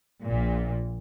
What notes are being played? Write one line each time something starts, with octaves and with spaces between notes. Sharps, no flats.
A#1 A#2